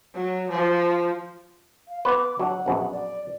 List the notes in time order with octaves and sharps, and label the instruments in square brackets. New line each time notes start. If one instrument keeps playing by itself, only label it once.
[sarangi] F#3
F3
[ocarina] F5
[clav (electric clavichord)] B3 B4 [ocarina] D6
[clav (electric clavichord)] F#3 D4 [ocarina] F#5
[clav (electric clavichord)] A#1 F#2 B2
[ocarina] D5